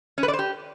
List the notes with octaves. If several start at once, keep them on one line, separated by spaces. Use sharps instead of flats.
C#4
B4
D5
C5
G4